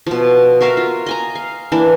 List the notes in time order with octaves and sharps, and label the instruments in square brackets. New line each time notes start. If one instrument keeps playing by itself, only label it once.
[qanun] B2 F3
F#4 A#4 E5 F5
F4
D#5 G#5 A#5
F5
E3 A#3 D4